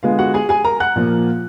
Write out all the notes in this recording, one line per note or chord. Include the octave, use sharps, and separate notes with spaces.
D3 G#3 B3 F4 F5
F#4 F#5
G#4 G#5
G#4 G#5
A#4 A#5
F#5 F#6
A#2 F3 A#3